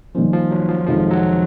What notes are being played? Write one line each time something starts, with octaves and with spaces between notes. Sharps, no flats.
D#3 F3 G3 A#3 C#4
F3
F#3
F3
F2 C3 D#3 F3 G#3
F#3